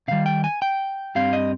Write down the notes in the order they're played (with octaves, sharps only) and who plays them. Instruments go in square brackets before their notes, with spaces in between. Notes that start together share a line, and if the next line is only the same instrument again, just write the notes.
[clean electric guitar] C3 D#3 G3 F5
G5
G#5
G5
G2 G3 C4 F5
D#5